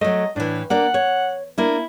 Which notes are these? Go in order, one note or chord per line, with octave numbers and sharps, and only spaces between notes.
F#3 A3 D#5
A2 E3 D4
A#3 D4 D5 F#5
C#5
A#3 D4 E4